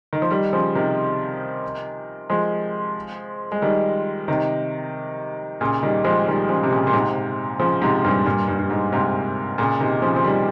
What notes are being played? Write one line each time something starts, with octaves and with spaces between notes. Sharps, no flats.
D#3
F3
D#3 G3
C#3 F3
C3 D#3
F3 G#3
G#3
D#3 G3
C3 D#3
A#2 C#3
D#3 G3
F3 G#3
D#3 G3
C#3 F3
C3
A#2 C#3
A#2
G#2 C3
C#3 F3
G#2 C3
G2 A#2
G2 A#2
G2
G2
G#2
G#2 C3
A#2 C#3
C3 D#3
C#3 F3
F3
D#3 G3